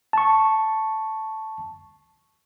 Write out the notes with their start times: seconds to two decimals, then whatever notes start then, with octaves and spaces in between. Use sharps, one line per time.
0.13 A5 C#6